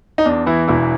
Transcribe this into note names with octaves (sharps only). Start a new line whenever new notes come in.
D#4
E2 D4
E3 E4
E1 E4